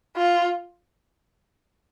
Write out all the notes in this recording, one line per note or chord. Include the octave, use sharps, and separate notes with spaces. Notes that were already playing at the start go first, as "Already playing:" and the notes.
F4